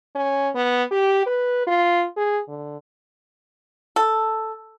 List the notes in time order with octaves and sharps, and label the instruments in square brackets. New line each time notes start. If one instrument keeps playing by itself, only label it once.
[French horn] C#4
B3
G4
B4
F4
G#4
D3
[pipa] A4